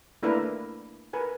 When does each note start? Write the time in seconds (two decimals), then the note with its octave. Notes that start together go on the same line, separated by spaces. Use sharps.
0.23 A3 A#3 D4 E4 A#4 B4
1.13 A#4 B4 G#5